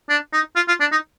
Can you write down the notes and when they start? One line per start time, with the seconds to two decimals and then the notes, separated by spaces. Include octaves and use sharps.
0.10 D4
0.33 D#4
0.56 F4
0.68 F4
0.80 D4
0.92 D#4